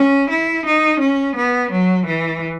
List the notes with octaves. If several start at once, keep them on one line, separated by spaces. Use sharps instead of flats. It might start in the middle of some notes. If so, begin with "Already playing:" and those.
Already playing: C#4
E4
D#4
C#4
B3
F#3
E3